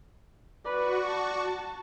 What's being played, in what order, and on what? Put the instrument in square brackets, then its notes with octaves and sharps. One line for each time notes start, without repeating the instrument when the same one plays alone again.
[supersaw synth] F#4 C#6 [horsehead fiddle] B4 [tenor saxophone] D5
[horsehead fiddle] A5